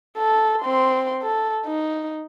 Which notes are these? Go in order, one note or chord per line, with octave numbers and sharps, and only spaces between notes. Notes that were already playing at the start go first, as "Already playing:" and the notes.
A4
C4 C6
A4
D#4